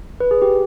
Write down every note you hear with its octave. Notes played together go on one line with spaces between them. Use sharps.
B4
G#4
G4